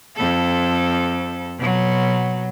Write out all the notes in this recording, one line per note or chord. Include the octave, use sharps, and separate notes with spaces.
F2 A4
B2 F#3